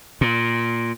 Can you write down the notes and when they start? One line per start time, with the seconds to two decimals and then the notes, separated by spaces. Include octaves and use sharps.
0.21 A#2